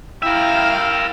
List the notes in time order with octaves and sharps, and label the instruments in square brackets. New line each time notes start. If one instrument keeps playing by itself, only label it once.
[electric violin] E4 G5 [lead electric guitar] A#4 E5 [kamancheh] F5